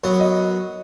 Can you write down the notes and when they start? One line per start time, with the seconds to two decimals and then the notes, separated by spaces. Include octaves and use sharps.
0.03 F#2 F#3 B3 C#5
0.20 D#5